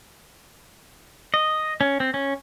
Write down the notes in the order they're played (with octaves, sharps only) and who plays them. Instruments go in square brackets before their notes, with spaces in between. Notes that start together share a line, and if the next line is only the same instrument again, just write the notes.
[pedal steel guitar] D#5
C#4
C4
C#4